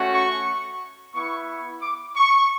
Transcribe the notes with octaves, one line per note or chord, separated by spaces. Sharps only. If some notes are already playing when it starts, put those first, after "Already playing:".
Already playing: A3 C#4 F#4
C#6
B3 E4 C#6
D6
C#6